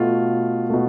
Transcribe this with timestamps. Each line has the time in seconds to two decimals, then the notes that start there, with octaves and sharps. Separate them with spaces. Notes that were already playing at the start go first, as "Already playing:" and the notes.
Already playing: B2 A3 F4
0.69 B2 A3